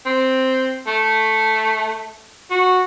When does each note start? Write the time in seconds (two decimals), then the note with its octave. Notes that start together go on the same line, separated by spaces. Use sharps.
0.06 C4
0.87 A3
2.51 F#4